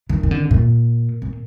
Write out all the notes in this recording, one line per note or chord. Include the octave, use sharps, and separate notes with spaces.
D#3
D#3
D3
A#2
A#2